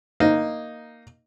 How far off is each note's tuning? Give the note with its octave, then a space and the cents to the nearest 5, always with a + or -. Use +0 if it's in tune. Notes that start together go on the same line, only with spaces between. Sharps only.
A#3 +0 D#4 +0